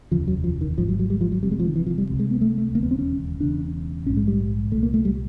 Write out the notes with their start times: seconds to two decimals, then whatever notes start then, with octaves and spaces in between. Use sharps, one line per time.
0.11 F1 D#2 C#3 F3
0.28 F#3
0.44 F3
0.61 D#3
0.77 G#1 G#2 F3
0.88 F#3
0.99 F#3
1.10 G3
1.21 F3
1.32 F#3
1.43 F1 F2 C3 G3
1.51 G#3
1.60 F3
1.68 D#3
1.76 E3
1.87 F3
1.98 G3
2.09 C#2 C3
2.19 G#3
2.31 B3
2.41 A3
2.58 A3
2.74 E1 D#2 C#3 A#3
2.83 B3
2.91 C4
2.99 C#4
3.40 E1 E2 C#3 D4
4.05 A#1 C#4
4.10 G#2
4.17 G#3
4.28 G3
4.71 C2 A3
4.75 A#2
4.83 A#3
4.94 A3
5.05 G3